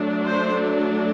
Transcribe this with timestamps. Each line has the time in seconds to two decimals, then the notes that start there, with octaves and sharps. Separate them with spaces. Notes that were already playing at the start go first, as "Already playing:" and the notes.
Already playing: F#3 A3 D4
0.25 C5